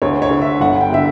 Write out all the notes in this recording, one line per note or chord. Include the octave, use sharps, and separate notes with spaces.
D2 C#5
C#5
D3
E5
G1 F#5
G5
D3 E5